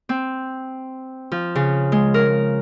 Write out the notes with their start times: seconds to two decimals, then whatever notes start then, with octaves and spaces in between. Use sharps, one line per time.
0.09 C4
1.32 F3
1.55 C#3
1.92 G#3
2.14 A#4